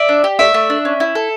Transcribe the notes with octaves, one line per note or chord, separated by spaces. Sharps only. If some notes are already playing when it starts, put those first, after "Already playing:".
Already playing: D5 E5
D4
G4
A3 D5 E5
A3
D4
C#4
E4
A4